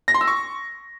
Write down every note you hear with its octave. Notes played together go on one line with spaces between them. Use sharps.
A#6
C6
E6
C#6